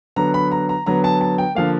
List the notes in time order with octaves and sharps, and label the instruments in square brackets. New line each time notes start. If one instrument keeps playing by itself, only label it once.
[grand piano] D3 F#3 B3 A#5
B5
A#5
A#5
D3 F#3 B3 A#5
A5
A5
G5
D3 F3 A#3 F5